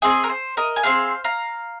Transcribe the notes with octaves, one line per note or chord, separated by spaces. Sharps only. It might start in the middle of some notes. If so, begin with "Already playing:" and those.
C4 G#4 D#5 G#5
A#4
C5
A#4 D#5
G#5
C4 D#4 G#4 C5 F5
F5 A#5